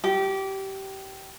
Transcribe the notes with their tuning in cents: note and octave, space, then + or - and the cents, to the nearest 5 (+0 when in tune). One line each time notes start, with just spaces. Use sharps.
G4 -20